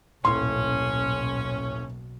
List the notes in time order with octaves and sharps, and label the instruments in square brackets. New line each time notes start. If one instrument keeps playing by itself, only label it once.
[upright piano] D#1 A2 [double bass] B1 [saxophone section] C#4 [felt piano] C6